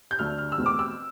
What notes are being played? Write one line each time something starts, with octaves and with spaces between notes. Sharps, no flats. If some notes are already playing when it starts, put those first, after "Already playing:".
G6
D2 D3 A3 F6
F6
E6
E2 B2 A3 C4
D6
E6